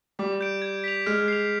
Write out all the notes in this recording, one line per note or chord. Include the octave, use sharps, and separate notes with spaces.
G3 D6
G6 D7
G#6
B6 F7
G#3 F6
C7 F7